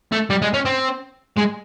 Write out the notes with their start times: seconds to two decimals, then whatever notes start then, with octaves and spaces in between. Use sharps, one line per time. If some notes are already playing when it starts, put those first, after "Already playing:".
0.12 A3
0.30 G3
0.42 G#3
0.54 C#4
0.66 C4
1.38 G#3